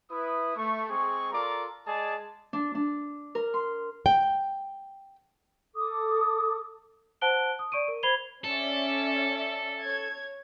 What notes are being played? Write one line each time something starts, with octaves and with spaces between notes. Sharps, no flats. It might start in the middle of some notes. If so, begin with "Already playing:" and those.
E4 B4 D#6
A3 C#6
G#3 C4 G#4 C#6
F4 A4 A#4 D5 A#5 D6
G#3 G#4 D5 D#5 A5
D4
D4
A#4
C6
G5
A4 D6 D#6
C5 F#5 A5 F#6 D7 G7
D#6
D5 C#6 D7 D#7
A#4
C5 B5 G#6 C7 F7 G7
C#4 A4 D5 E5
C#5 G#6